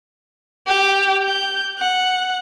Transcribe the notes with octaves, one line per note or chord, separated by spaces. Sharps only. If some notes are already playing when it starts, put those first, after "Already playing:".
G4
G6
F#5